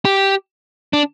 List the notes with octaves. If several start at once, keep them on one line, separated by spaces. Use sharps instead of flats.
G4
D4